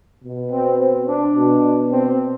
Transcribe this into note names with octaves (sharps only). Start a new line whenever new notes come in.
B2
C4
C4
D4
B2
C4